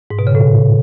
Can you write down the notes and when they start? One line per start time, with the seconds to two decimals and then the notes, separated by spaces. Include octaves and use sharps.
0.10 G#2
0.19 B2
0.27 C#3
0.35 A2